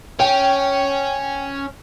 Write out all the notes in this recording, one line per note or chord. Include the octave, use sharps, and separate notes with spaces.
C#4 G5